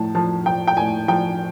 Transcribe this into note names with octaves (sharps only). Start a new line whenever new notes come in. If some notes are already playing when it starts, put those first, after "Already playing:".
Already playing: A2 F3 A5
F3 A5
F3 G5
G5
A2 G#5
F3 G5